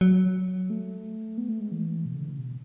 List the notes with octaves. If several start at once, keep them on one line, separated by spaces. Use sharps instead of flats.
F#3
A3
B3
A3
G#3
E3
B2
C#3
D3
C#3
B2